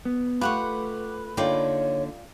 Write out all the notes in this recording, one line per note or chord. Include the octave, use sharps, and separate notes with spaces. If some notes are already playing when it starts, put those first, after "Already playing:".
B3
A3 F4 G4 B4 F#5 C#6
D3 A#3 D#4 F4 C#5 D5 G5